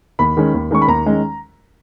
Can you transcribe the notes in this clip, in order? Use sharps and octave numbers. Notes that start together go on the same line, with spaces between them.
D#2 B5
D#3 G#3 C#4
D#2
D#3 G#3 C#4 C#6
B5
D#2 A#5
D#3 G#3 C#4